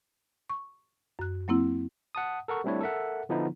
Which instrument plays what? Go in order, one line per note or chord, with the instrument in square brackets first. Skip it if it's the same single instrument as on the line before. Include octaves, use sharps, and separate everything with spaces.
[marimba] C#6
F#2 F#6
F#3 A#3 C4 E4
[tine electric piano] F#5 A5 D#6
A4 A#4 F#5 C#6
G3 A3 C4 D4 E4 C#5
A4 A#4 E5 F#5
D3 F3 B3 D#4 E4